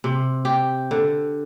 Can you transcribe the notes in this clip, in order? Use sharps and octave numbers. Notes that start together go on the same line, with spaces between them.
C3
G4
D3